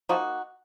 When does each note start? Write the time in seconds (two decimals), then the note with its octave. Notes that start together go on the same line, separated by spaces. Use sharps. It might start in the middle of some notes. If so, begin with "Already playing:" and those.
0.09 F3 A#3 D#4 F#4